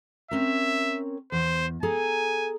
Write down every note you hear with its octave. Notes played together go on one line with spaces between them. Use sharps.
C4 C#4 A#4 E5
E2 C5
G#4 A4 G#5 A#5